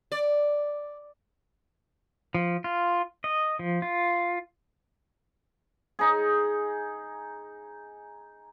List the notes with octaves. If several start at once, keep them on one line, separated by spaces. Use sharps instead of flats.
D5
F3
F4
D#5
F3
F4
D#4 G#4